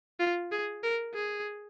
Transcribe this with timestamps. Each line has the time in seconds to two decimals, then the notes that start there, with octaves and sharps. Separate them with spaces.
0.20 F4
0.52 G#4
0.83 A#4
1.14 G#4